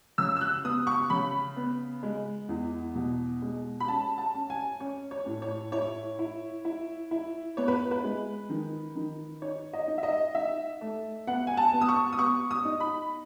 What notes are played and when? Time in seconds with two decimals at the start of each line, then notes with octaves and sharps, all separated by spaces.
0.18 C#3 E6
0.36 E6
0.41 F#6
0.64 B3 D#6
0.87 C#6
1.10 C#3 B5
1.56 B3
2.03 G#3
2.49 E2
2.95 B2
3.42 G#3
3.80 B5
3.88 C#4 A5
4.18 A5
4.34 C#4
4.50 G#5
4.80 C#4 C#5
5.11 C#5
5.26 A2
5.42 C#5
5.72 E4 C#5
6.19 E4
6.65 E4
7.11 E4
7.57 B3 C#5
7.68 B4
7.91 B4
8.04 G#3
8.49 D#3
8.95 D#3
9.42 D#4 C#5
9.73 D#5
9.88 D#4
9.98 E5
10.03 D#5
10.35 D#4 E5
10.81 A3
11.27 B3 F#5
11.47 G#5
11.57 A5
11.73 B3
11.81 D#6
11.89 C#6
12.13 D#6
12.19 B3 C#6
12.51 D#6
12.65 D#4
12.80 B5